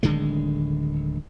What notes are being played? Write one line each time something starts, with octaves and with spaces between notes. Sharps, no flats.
D1 D3 D#3 G#3